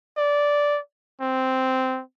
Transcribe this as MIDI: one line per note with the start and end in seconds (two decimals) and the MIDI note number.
0.17 0.80 74
1.21 2.01 60